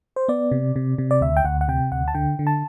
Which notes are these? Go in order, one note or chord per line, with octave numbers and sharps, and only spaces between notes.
C5
B3 D5
C3
C3
C3
D5
D2 E5
G5
D2 F#5
F#5
C3 G5
D2 F#5
A5
D3 G5
D3
A5